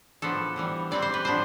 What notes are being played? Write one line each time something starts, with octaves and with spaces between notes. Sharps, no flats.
A2 F3 B3 D4 A4
A2 E3 G3
A2 E3 G3 C4 D5
C5
B4
A2 F3 B3 D4 C5